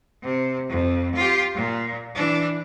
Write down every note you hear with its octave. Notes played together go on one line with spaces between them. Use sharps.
C3
F2
F4 G4
A#2
E3 D4